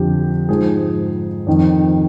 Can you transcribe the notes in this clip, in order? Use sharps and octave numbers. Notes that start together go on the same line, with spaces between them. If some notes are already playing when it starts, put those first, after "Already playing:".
Already playing: F2 D3 F3 G4
G#2 F3 G#4
F2 D#3